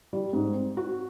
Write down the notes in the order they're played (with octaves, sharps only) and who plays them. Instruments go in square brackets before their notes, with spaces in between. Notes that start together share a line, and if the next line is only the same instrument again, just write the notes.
[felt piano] G3
G#2
C4
F#4